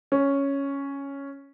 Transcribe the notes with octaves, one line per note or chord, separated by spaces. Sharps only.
C#4